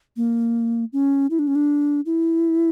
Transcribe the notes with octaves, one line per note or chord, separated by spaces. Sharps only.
A#3
C#4
E4
D4
C#4
D4
E4